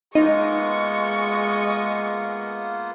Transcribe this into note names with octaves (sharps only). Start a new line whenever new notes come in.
G#3 A#3 B3 D#4 F4 C#6